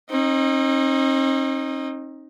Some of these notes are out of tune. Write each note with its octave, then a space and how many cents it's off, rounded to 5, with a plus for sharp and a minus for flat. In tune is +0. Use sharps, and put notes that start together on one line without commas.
C4 +45 D#4 +0